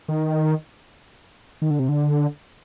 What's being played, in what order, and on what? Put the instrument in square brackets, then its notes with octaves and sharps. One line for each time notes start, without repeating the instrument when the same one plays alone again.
[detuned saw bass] D#3
D#3
D3
C3
D3